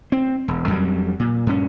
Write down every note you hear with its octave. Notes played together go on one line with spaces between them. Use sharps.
C4
E1
F2 F#3 G3
A#2
G2 C#4